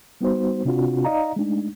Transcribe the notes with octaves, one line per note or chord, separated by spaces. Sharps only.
G3 B3 D#4 F#4 C5
C3 C4 D4 F4 F#4
D#4 D5 D#5 F5 A#5
G#3 A3 D4 D#4